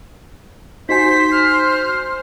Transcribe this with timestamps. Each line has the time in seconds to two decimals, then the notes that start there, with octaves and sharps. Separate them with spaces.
0.89 D#4 F#4 C5 G#5 B6
1.32 F6